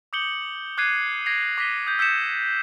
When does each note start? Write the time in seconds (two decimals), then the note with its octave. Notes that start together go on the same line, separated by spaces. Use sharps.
0.13 D6 D#6 G6 C#7 F#7 G7
0.78 D6 F#6 G#6 C7 D#7
1.26 G#6 A#6 C7 D7 F7
1.58 D6 A#6 B6 D#7 G7
1.86 D#6 G6
1.98 D#6 E6 G6 B6 C#7 E7